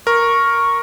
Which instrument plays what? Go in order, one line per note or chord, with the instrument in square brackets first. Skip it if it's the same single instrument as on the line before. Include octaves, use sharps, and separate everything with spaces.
[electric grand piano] A#4 [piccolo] C#6